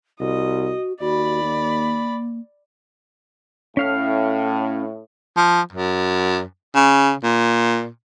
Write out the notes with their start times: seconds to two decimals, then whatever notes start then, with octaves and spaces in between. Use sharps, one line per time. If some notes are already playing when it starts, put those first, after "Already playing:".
0.20 C2 F#4 D#5
1.01 D#2 F#4 D5 B5
1.43 A#3
3.77 A2 C#4 F5 F6
5.37 F3
5.73 F#2
6.75 C#3
7.23 A#2